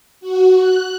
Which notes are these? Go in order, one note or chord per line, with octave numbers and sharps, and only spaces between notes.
F#4
F#6